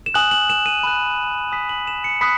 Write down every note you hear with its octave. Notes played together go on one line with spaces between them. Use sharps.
E7
G#5 D#6 F#6 F#7
F#7
E7
D#7
B5 F#6
G#5 D#6 F#6 B6
F#7
E7
C#7
B5 D#6 F#6 B6